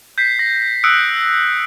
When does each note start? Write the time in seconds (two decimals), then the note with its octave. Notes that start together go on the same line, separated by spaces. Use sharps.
0.18 G6 B6 C7
0.39 A#6
0.84 D#6 E6 F#6 C#7 D7